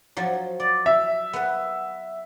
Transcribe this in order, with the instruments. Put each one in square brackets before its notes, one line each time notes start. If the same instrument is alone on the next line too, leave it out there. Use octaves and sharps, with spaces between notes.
[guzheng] F3 F#3
D5
[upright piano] E5
[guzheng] B3 B4